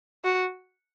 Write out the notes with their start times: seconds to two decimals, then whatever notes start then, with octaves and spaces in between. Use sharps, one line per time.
0.24 F#4